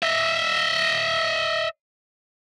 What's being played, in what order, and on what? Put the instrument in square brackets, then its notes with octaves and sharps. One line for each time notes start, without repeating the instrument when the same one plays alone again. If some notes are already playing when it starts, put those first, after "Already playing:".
[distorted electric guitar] D#5 E5